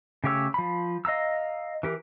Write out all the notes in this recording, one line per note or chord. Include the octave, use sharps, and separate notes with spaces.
C#3 A3 G4 C#5 E6
F3 B5
D#5 F5 A#5 E6
E3 G4 A#4